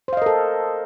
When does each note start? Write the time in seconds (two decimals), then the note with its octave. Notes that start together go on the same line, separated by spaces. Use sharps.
0.08 C5
0.13 F5
0.17 D#5
0.22 A#4
0.26 A4